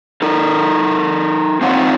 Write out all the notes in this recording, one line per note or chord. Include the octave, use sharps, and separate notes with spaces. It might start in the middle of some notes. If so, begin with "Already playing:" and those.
D#4 A4 A#4
C4 D#4 F4 C#5 F#5